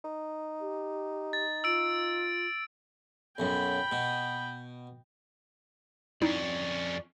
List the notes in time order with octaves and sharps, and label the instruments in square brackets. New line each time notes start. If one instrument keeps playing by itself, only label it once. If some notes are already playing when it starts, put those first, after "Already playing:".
[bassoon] D#4
[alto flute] G4
[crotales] A6
[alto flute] F4 [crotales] E6 D7
[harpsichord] B1 F#2 [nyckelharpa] G5 B5
[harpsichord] B2
[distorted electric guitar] F2 C#4 [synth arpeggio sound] D#4 E4 [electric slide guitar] D5